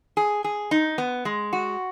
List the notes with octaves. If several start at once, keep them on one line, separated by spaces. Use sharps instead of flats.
G#4
G#4
D#4
B3
G#3
F#4